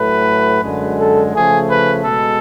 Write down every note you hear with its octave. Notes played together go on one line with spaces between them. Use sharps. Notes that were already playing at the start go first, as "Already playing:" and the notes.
Already playing: A2 F#3 A3 B4
F#2 D3 G#3
A4
C#3 F3 A3 G#4
B4
B2 G#3 A4